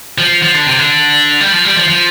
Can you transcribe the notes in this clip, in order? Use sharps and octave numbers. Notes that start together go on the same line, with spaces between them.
F3
F3
D3
C3
D3
G3
F3
G3
F3
F3